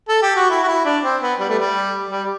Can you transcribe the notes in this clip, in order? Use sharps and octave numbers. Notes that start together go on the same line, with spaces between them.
A4
G4
F#4
E4
F#4
E4
D4
C4
B3
G3
A3
G3
G3